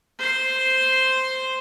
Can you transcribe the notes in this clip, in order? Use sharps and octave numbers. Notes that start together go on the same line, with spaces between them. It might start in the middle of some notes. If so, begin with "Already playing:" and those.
C5 C6